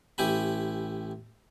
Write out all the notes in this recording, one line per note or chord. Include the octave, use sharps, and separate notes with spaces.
A1 E4 G4 G#5 B5